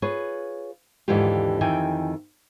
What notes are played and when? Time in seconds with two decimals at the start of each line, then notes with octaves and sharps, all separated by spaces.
0.02 F4 G#4 B4 C#5
1.08 D#2 G#2 D3 E3 F4 G4
1.61 F2 D#3 E3 G5 G#5